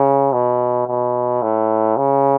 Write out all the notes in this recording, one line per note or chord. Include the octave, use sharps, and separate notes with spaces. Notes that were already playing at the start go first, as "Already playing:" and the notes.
Already playing: C#3
B2
B2
A2
C#3